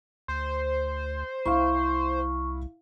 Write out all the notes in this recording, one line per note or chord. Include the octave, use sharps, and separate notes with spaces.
D2 C5
C2 E4 F5 C#6